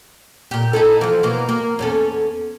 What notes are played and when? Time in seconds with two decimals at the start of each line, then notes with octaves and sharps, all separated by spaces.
0.51 A#2 G4
0.73 D#4 E4 A4
1.01 E3 F3
1.23 B2 E3 A#3
1.49 A#3
1.79 E2 C#4 A4